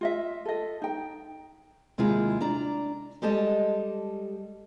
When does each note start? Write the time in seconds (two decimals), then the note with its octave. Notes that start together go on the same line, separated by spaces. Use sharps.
0.01 F4 D#5 E5
0.45 A4 D#5
0.82 D#4 G5
1.98 D#2 C3 G#3 E4 F4
2.41 D4 D5 A#5
3.22 G3 G#3 G4 A4 D#5 A5